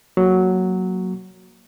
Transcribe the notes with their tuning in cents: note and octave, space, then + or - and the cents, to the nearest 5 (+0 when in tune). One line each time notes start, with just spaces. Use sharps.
F#3 +0 A#3 +0